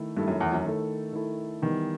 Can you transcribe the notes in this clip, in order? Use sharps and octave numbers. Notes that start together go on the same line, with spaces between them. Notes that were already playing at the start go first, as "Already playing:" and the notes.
Already playing: D#3 A3 E4 A4
G2 D#3 A3 E4 A4
F#2
E2
F#2
D#3 A3 E4 A4
D#3 A3 E4 A4
D#3 E3 G3 B3 D#4